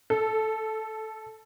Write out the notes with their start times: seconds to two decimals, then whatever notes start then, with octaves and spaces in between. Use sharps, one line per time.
0.10 A4